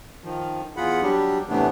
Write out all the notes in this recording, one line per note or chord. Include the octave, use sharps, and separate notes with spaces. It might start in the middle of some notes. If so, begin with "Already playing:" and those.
D#3 F3
E2 F4 G#4 F#5 B5
F#3 G3 D4 G4
A2 C3 E3 A3 B3 D4